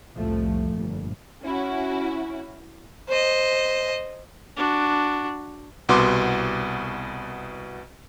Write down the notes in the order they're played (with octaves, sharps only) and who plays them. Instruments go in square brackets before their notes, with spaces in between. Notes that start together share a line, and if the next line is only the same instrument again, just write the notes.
[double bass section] C2 F2 A2 F3 A3
G1 A#2
[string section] C#4 E4 F#4
[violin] C5 D#5
[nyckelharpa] D4 F#4
[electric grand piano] C2 B2 B3 C6 D6